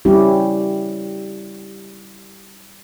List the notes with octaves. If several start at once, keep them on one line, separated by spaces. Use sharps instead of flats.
G3 C#4 E4 G4